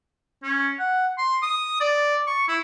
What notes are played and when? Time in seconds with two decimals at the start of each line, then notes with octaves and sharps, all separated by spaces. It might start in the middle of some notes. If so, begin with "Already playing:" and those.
0.43 C#4
0.79 F#5
1.18 C6
1.42 D#6
1.81 D5
2.27 C#6
2.48 E4